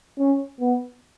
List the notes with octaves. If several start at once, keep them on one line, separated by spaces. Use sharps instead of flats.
C#4
B3